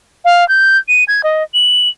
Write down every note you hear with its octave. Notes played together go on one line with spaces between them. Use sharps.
F5
G6
D#7
G#6
D#5
F#7